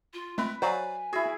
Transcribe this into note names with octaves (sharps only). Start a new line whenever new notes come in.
F4
G#3 A3 C4 B4
F#3 C5 D5 F5 G#5
E4 F#4 G#4